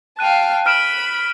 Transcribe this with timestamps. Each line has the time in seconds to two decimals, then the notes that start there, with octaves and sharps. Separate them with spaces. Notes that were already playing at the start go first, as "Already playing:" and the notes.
0.19 F5 G5 A5 F#6 D#7
0.66 B5 F6 D7 E7